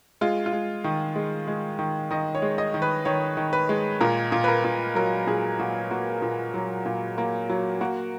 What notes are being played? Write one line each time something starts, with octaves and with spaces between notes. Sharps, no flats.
G#3 F4
F4
G#3
D#3
G#3
G#3
D#3
D#3 D#5
C#5
G#3
D#5
D#3
B4
D#3 C#5
D#3
B4
G#3
A#2 A#4
A#2
B4
A#4
A#2
F#3 A#4
A#2 G#4
A#2 F#4
A#3 F#4
A#2
F#3
A#2
A#3
F#3
A#3 F#4